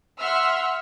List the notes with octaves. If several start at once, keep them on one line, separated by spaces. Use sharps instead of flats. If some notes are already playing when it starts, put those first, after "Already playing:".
E5 F#5 C6 E6 F6